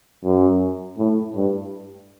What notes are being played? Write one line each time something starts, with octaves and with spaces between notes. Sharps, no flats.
F#2
A2
G2